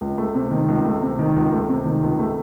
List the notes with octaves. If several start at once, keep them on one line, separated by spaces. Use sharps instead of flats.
C#2
A3
C3
D#3
C#2
A3
C3
D#3
C#2
A3
C3
D#3
C#2
A3